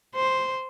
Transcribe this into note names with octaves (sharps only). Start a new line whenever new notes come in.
C5